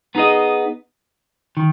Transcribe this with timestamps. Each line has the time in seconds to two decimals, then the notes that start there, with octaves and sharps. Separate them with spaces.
0.15 B3 D#4 G#4 D#5
1.57 D#3